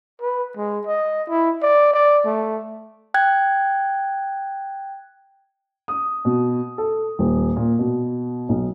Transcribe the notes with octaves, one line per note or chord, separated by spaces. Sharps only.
B4
G#3
D#5
E4
D5
D5
A3
G5 F#6 G#6
D#6
B2
A4
D#1
A#2
B2
B1